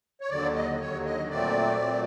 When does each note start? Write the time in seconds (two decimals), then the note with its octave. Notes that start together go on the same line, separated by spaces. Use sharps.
0.21 C#5
0.29 D#2 D3 F#3 D5
0.55 D#5
0.80 D#2 D3 F#3 C#5
1.05 D#5
1.30 A#2 F#3 A3 C4 D5
1.79 A#2 F#3 A3 C4